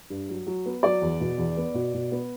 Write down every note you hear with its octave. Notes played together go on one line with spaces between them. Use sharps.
G2
F#3
F#3
B3
F#3 D5
E2
B2
E2
B3
B2
B2
B3